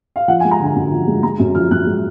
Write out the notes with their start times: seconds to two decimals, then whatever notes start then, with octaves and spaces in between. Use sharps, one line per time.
0.16 F5
0.28 F3 F#5
0.40 G#5
0.44 G#3
0.51 A#5
0.60 D3 G#5
0.76 F#2
0.92 F3
1.07 G#3
1.23 G#3 A#5
1.39 F#2
1.55 F3 F6
1.71 F#2 F#6
1.86 G#3